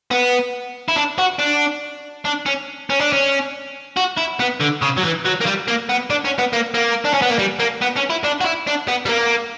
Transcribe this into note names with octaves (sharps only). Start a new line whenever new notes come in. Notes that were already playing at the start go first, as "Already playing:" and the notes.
B3
E4
D4
F#4
D4
D4
C#4
C#4
D4
C#4
F#4
E4
B3
D3
C#3
F#3
E3
F#3
A#3
G3
A#3
B3
D4
C#4
B3
A#3
A#3
D4
C#4
B3
A#3
G3
A#3
B3
C#4
E4
D4
F#4
E4
D4
B3
G3
A#3